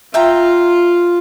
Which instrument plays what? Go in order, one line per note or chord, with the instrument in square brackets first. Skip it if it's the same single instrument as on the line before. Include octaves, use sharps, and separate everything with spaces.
[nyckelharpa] F4 [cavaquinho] E5 G5 A#5